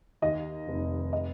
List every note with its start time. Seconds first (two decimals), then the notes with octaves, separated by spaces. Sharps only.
0.22 D#2 D#5
0.68 F1
1.13 D#5